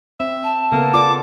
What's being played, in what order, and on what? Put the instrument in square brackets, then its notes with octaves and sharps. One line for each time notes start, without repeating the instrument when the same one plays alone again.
[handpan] C4 [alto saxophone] E5
[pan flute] A5
[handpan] C#3 B3 A4 [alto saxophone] A#3
[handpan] F4 D5 [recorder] D6